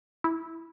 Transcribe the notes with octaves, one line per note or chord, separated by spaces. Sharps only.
E4